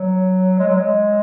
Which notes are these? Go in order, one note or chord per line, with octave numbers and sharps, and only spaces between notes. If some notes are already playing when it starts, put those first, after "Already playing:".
Already playing: F#3
G#3
F#3
G#3